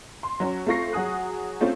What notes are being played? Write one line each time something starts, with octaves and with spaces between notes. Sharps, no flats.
C6
F#3 C#4
A3 C4 F4 C#6 A#6 C7
F#3 F#4 G#4 D#6 F#6
A3 C4 C#4 F4